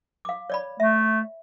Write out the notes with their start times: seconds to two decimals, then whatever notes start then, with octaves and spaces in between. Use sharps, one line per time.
0.25 F5 D6
0.50 C#5 D5 B5
0.80 A3 E5